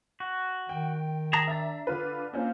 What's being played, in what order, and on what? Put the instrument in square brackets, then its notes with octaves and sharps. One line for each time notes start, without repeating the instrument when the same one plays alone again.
[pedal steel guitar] F#4
[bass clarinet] D#3 [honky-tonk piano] G5
[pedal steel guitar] G#4 A5 A#5
[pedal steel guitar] D4 [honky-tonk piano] E5 A#5 A6
[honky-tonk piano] D3 F4 B4
[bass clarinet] A#3 [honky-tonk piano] C4 C#4 F4